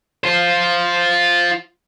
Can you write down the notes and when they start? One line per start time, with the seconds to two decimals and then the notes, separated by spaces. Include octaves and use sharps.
0.24 F4 C5